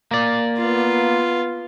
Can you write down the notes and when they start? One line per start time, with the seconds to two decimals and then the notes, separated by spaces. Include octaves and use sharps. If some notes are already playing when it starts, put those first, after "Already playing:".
0.11 A#3 D5
0.58 B3 F4